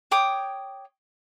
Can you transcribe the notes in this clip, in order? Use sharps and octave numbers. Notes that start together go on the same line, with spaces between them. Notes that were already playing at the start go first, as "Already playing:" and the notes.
C#5 G5 D6 D#6